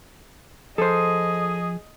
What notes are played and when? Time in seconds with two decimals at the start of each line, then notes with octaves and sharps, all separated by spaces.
0.78 F3 G#4 A4 C5 D#5